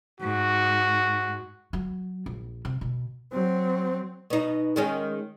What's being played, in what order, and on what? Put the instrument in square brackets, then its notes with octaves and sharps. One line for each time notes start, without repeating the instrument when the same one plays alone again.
[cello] G#2 [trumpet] F#4
[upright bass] F#3
A#1
C3
B2
[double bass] F#3 C4
[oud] B2 D#4
D#3 G#3 C#4